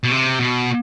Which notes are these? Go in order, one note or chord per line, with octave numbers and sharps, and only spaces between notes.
B2
C3
B2